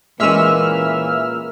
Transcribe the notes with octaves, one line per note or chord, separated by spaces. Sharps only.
A#2 E3 G#3 A#3 C#4 E5 E6 F6